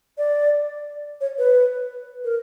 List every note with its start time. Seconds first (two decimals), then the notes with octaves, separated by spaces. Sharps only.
0.18 D5
1.21 C#5
1.38 B4
2.25 A#4